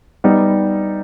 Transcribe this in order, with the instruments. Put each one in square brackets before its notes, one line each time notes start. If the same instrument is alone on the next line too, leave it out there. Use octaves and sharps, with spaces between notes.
[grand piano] G3 B3 D#4